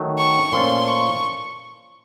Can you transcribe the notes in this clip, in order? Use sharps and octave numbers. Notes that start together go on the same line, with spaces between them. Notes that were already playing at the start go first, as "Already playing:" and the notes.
Already playing: D#3 F#3 A3
C#6
A#2 F3 A3 C#4 F4 C6
C#6